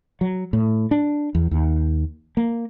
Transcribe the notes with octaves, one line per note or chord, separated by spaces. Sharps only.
F#3
A2
D4
E2
D#2
A#3